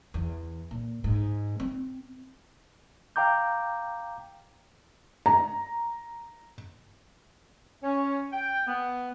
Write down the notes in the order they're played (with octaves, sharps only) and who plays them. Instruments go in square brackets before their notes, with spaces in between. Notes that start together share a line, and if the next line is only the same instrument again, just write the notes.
[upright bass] E2
A#2
G#2
C4
[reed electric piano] F5 G5 A#5 D6 G6
[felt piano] A#5
[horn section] C#4
G5
B3